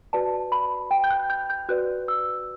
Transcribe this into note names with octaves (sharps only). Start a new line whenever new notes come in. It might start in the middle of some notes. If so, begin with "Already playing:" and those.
F#4 B4 D5 A5
B5
G5
G6
F#6
G6
G6
F#4 B4 D5 F#6
E6